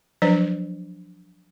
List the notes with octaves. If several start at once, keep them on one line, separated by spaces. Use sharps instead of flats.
F3 F#3 D4 B4 C5